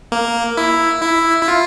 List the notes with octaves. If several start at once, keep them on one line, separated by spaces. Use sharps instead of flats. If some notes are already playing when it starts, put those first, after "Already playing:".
A#3
E4
E4
E4
F4